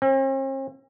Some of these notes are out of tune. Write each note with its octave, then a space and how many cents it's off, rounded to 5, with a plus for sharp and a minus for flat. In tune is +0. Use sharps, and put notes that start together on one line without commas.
C4 +45